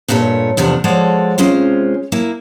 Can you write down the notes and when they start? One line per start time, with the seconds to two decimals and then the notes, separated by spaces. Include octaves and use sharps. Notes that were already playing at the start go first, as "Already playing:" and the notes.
0.08 G2 A#2 A3 A4 C#5
0.57 E2 C3 F3 A3 D4
0.84 F3 G#3 F#4 A4 C#5 D5
1.38 C3 G#3 C#4 F4 C5
2.12 A#3 E4